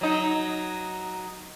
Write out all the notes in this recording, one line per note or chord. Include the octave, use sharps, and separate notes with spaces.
F#3 D#4